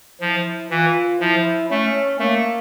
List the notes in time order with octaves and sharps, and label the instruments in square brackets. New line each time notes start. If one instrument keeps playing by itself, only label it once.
[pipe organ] F3 [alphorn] E4
[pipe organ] E3 [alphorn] F4
[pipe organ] F3 [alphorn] E4
[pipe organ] A3 [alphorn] C#4
[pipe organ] A3 [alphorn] A#3